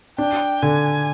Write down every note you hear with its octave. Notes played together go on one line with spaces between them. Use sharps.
D4 G5
D3 G#5